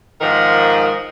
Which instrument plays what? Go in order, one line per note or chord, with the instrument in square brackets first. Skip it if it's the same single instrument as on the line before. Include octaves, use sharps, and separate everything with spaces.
[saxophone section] G#2 D#3 F3 A#4